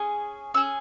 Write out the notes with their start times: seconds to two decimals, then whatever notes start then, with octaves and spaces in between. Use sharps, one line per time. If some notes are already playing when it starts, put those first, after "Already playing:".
Already playing: C#4 G#4
0.54 C#4 E6
0.57 G#4